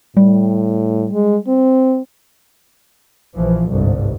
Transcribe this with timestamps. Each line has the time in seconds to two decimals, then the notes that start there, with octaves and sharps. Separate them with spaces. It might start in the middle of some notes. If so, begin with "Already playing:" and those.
0.17 A2 G3
1.13 G#3
1.48 C4
3.35 A#1 E3 F3
3.69 G1 C2 G#2